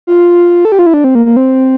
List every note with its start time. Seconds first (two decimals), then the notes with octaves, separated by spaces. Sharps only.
0.07 F4
0.65 A4
0.72 G4
0.79 F4
0.86 E4
0.94 D4
1.04 C4
1.15 A#3
1.26 A#3
1.36 C4